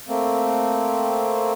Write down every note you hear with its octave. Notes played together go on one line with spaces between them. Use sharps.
A3 A#3 C4